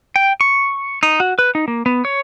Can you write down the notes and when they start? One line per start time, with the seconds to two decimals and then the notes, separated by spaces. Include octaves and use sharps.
0.16 G5
0.41 C#6
1.03 D#4
1.20 F#4
1.39 B4
1.55 D#4
1.68 A#3
1.86 B3
2.05 C#5